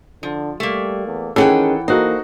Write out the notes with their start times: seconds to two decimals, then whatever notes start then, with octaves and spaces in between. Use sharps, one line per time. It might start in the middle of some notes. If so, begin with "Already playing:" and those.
0.23 D3 F3
0.60 G3 A3 A#3
1.06 E2
1.36 D#3 E3 C#4 G#4 A4 F#5 G5
1.88 A#3 D#4 F#4 A4 C5